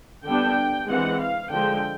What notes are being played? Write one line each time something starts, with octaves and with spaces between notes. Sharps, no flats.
D3 G3 B3 D4 G5
E3 G#3 C4 F#5
F5
D3 F3 G#3 G5